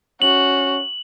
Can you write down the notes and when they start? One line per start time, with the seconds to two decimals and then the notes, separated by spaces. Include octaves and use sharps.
0.22 C#4 F#4 F#7